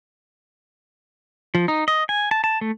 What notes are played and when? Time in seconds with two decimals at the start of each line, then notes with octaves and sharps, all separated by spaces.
1.55 F3
1.68 D#4
1.88 D#5
2.09 G#5
2.31 A5
2.44 A5
2.61 A3